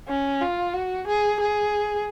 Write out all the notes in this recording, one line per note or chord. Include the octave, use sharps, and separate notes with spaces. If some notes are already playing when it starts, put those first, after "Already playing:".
C#4
F4
F#4
G#4
G#4